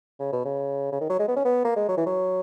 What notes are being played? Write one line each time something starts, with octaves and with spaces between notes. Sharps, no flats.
C#3
B2
C#3
C#3
D#3
F#3
G#3
B3
C#4
B3
A#3
G#3
F#3
E3
F#3